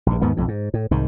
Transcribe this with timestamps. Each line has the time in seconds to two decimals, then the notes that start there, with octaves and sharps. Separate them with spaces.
0.06 A#1 G2
0.22 D#2 G#2 D#3 B3
0.37 B1 F2 A2
0.48 G#2
0.74 A2
0.91 C2 G#2 D#3